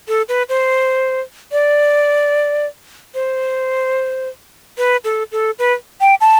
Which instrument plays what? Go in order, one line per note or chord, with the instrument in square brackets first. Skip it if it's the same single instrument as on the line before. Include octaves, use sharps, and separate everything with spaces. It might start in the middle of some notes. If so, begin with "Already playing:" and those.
[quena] A4
B4
C5
D5
C5
B4
A4
A4
B4
G5
A5